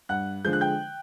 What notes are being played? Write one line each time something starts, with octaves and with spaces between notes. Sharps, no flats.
G2 F#5 F#6
D3 F3 G#3 G6
F#6
G5 G6